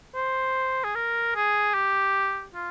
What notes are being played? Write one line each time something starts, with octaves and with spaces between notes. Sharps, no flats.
C5
G#4
A#4
G#4
G4
F4